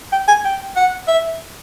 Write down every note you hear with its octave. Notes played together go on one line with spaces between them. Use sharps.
G5
G#5
G5
F#5
E5